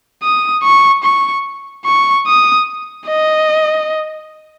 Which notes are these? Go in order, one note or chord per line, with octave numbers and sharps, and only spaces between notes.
D#6
C#6
C#6
C#6
D#6
D#5